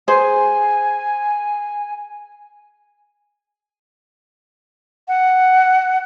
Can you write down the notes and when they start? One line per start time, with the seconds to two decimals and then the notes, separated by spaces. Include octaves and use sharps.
0.08 G#4 C5 G#5
5.08 F#5